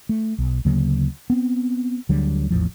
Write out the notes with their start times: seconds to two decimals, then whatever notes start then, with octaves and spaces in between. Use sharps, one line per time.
0.09 A3
0.38 B1
0.65 D2 C#3 F#3 A#3
1.30 B3 C4
2.09 D2 D3 F#3 G3
2.50 D#1 A1 E2 F3